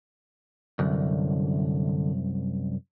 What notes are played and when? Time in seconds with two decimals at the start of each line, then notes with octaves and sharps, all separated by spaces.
0.79 C2 F#2 D3